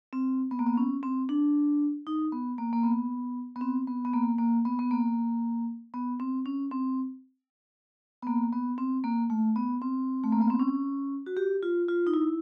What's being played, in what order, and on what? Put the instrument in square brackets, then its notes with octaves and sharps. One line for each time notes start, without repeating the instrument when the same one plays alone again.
[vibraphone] C4
B3
A#3
B3
C#4
C4
D4
D#4
B3
A#3
A#3
B3
B3
C4
B3
B3
A#3
A#3
B3
B3
A#3
B3
C4
C#4
C4
B3
A#3
B3
C4
A#3
A3
B3
C4
A3
A#3
B3
C4
C#4
F#4
G4
F4
F4
D#4
E4